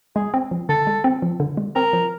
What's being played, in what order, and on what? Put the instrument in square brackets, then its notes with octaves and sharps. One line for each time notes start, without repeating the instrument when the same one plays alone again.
[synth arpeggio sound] G#3 [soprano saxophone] G#4
[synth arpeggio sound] C4
F3
[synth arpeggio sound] D3 [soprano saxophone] A4
[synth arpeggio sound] G#3
C4
F3
D3
G#3
[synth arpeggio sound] C4 [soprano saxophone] A#4
[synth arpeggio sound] F3